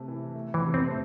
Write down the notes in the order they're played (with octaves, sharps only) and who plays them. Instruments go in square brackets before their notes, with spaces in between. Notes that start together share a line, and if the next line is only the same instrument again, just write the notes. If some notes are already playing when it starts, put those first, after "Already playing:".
Already playing: [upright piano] C3 A3
E3
A3
[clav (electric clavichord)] E3
[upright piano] C3
[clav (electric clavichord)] C4
[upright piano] A3